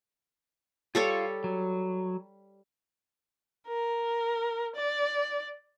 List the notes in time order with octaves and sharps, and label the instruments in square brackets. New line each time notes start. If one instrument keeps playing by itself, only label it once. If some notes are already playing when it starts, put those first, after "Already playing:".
[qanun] G3 A4 C#5 [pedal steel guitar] F4
[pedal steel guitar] F#3
[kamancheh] A#4
D5